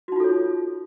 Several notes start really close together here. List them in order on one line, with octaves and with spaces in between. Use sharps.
F#4 D#4 F4 A4 C#5